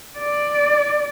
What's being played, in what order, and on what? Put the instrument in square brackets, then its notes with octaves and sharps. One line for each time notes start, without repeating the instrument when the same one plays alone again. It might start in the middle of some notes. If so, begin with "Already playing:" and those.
[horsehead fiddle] D5